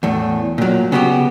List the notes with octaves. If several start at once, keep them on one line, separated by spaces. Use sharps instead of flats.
E2 A2
A#2 F#3
C#3 B3 F#4 G4